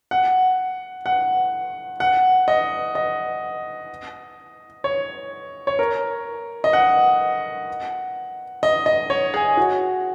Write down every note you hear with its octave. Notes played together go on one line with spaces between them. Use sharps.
F#5
F#5
F#5
D#5
D#5
C#5
C#5
A#4
D#5
F#5
D#5
D#5
C#5
G#4
F#4